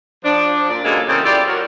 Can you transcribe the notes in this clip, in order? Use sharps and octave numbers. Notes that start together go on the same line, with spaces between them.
F3 D4
A#2 D5
A#2 C#3 F#3 G#3 A#3 A4
E2 C#3 A3 C4 A4 A#4
E4 F4 G4 D5
F#3 F#4 A#4